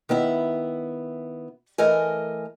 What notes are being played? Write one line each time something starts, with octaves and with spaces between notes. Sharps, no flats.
D#3 B3 E4 E5
E3 A3 A#4 D#5 G#5